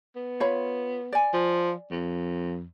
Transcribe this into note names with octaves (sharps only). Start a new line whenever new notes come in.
B3
F4 C#5 B5
D5 G#5
F3
F2